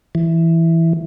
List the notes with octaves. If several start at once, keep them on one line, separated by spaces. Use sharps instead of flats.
E3